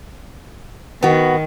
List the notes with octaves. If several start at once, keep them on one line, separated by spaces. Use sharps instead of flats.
D#3 B3 F#4